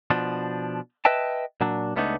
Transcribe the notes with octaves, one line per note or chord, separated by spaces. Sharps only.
B2 F3 D4
B4 D#5 E5 G5 A5
A#2 F#3 D4
C#2 G3 A3 B3 D4 D#4